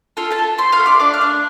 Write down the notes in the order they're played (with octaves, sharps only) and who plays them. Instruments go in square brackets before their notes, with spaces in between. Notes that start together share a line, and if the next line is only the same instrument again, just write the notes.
[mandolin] F4 A4 F5
A4 A5
F4
A3 C5 C6
F5 F6
A3
D5 D6
D4 D5 D6
F5 F6
D4